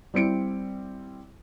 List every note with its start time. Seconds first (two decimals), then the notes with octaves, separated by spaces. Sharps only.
0.14 G3 C4 E4 C#7 D7